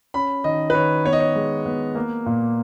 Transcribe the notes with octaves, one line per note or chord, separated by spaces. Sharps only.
C#4 B5
D#3 D#5
B4
D#3 C#5
B3 C#5
D#5
C#5
G#3
B3
A#3
A#2